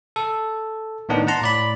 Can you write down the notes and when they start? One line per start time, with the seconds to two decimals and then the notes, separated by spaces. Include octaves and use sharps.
0.16 A4
1.09 A2 D#3 B3 D4 D#4
1.27 F#5 A5 A#5 C6
1.42 A2 D5 B5